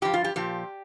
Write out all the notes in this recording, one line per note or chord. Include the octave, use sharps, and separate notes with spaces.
G2 F3 G4
F4
G4
A#2 F3 G4